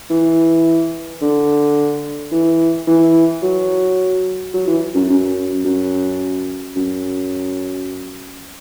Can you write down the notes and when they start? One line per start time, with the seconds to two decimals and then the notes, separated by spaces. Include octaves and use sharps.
0.10 E3
1.22 D3
2.31 E3
2.87 E3
3.42 F#3
4.54 F#3
4.67 E3
4.95 F#2
5.09 F#2
5.65 F#2
6.76 F#2